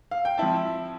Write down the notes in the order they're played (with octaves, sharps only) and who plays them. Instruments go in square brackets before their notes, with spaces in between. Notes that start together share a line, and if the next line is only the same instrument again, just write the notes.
[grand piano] F5
G5
F3 C4 E4 A5